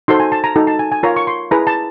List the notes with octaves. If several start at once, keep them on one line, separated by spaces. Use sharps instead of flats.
D#4 F#4 A4 C5 C6
G#5
A5
A#5
D#4 F#4 A4
A5
G#5
G#5
F4 A#4 C#5 A#5
C#6
C6
E4 G#4 B4 A#5
A5